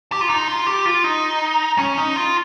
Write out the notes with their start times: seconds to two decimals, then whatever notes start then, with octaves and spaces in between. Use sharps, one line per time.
0.12 G4
0.21 F4
0.29 D#4
0.48 F4
0.67 G4
0.85 F4
1.04 D#4
1.78 C#4
1.97 D#4
2.16 F4